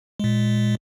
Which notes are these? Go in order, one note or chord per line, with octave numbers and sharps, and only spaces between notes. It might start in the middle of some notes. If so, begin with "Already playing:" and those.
A#2 G#3